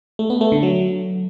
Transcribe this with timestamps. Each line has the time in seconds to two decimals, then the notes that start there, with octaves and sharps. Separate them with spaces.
0.19 A3
0.30 B3
0.41 A3
0.52 D3
0.63 F#3